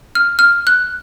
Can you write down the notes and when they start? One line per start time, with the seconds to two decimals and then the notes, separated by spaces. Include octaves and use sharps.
0.15 F6
0.39 F6
0.67 F#6